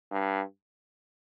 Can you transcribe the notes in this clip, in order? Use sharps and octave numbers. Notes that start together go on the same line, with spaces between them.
G2